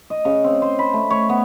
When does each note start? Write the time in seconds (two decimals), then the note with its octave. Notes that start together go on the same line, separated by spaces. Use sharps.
0.10 D#5
0.25 C#3
0.44 C4
0.62 C5
0.79 B5
0.93 A3
1.10 C#5
1.29 B3